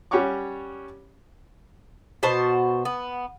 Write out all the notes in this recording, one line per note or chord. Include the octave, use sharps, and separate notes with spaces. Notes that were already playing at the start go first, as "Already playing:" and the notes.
G3 C#4 C#5 F#5 C#6 D6
B2 F#4 C5 A5
B3